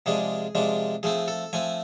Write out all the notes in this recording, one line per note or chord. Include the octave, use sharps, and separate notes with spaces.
C3 F3 G#3 D4 G#4
C3 F3 G#3 D4
F3 A3 C4 G#4
A4
F3 A3 C4 G#5